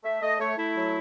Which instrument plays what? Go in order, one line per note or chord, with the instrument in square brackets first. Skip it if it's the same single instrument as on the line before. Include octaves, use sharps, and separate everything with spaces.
[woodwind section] A3 E5
A3 D#5
A3 C#5
A3 E4
F#3